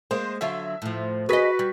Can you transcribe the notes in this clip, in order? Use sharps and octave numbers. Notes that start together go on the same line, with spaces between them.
G#3 A#3 C5
D3 F#3 F4 E5
A2 F3
F#4 G#4 B4 D#5 B6
G3